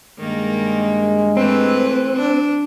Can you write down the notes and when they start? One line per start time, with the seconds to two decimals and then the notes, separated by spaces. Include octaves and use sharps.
0.20 G2 D#3 G#3 A#3
1.37 E3 A3 C4 B4
2.15 D4